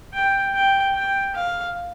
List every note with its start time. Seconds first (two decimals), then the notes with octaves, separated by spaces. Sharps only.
0.14 G5
0.54 G5
0.95 G5
1.35 F5